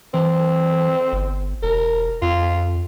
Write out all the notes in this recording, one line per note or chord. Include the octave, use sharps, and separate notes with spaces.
E3 C4
G1
E1 A#4
F2 F4